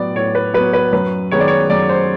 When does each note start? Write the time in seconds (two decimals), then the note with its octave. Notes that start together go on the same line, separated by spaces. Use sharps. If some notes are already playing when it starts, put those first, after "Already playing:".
Already playing: A2 F#3 B3 D5
0.16 A2 C#5
0.35 B4
0.54 F#3 B3 B4
0.73 B4
0.92 F#2 B4
1.31 D#3 G#3 B3 C#5
1.40 D5
1.48 C#5
1.70 F#2 D5
1.89 C5